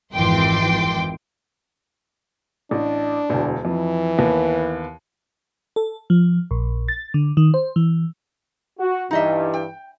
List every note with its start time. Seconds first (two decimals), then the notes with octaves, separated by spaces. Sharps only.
0.13 G#1 F2 E3 G5 C6 D6
2.71 A1 D4
3.30 E1 D2
3.65 F2 E3
4.18 D#2 B3
5.76 A4
6.10 F3
6.51 A#1
6.88 A6
7.14 D3
7.37 D#3
7.54 C5
7.76 E3
8.79 F#4
9.11 G2 E3 D#4 D#5 E5
9.54 G5